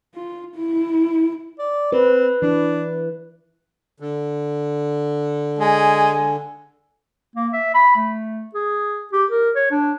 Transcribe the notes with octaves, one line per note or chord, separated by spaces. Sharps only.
F4
E4
D5
C4 B4
E3 D4
D3
G#3 G#5
A#3
E5
B5
A3
G#4
G4
A#4
C#5
D4